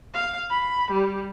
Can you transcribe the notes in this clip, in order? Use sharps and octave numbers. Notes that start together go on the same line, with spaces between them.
F5
B5
G3